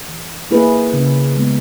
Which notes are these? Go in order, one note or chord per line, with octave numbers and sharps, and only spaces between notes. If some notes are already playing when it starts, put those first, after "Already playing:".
E3
A#3 E4 G#4 B4
C#3
G#3 B3